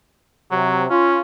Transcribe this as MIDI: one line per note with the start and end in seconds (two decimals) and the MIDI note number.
0.51 0.87 48
0.51 0.85 54
0.90 1.21 61
0.90 1.20 65